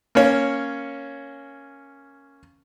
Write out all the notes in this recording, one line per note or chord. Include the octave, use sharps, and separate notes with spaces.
A#3 C#4 C#5